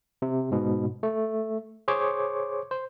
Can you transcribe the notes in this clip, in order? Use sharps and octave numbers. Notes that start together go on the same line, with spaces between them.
C3
G#2 B2
A3
G#4 C5 C#5 D6
C5